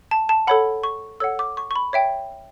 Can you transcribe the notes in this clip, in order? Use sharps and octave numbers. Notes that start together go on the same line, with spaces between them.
A5
A5
A4 C#5 F#5 B5
C#6
A4 C#5 F#5 E6
D6
C#6
C#6
B5
C#5 E5 G5